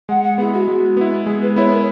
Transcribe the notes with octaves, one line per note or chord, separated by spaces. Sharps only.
G#3 F#5
F#5
B3 E4 G#4
F#4
G#3
B3 E4
G#3 G#4
B4
B3 E4 C#5
A#4